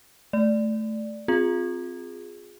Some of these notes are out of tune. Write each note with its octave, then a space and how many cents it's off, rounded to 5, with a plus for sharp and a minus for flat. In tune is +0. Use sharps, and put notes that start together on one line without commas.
A3 -10 D5 +0
C4 +0 F4 +25 G#4 +0